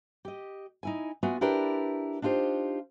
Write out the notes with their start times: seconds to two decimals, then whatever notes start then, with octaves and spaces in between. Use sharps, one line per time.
0.25 G4 D#5
0.83 D#4 E4 G#5
1.23 B3 F4 F#4 E5 G#5
1.41 D4 E4 G4 A#4 B4 D5
2.22 D4 D#4 F4 G4 C5